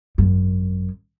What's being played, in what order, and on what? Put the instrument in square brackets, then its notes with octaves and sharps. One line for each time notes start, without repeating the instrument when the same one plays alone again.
[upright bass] G#1 F#2